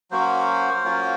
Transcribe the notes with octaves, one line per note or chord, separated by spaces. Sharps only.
F#3 A#3 C#4 F#4 C5
F#3 A#3 C#4 F4